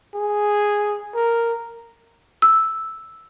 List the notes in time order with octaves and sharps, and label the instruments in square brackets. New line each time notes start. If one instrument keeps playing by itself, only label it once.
[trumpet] G#4
A#4
[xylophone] E6